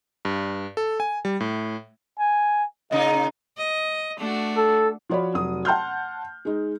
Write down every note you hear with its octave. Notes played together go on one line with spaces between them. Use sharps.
G2
A4
G#5
G3
A2
G#5
A#2 C#3 D#4 D#5
D#5
A3 D4 F#4
A4
F3 F4 F#4 C#5 D5 B5
F1 F#3 D#6
F#5 A5 C6 F6 G6
G#3 D#4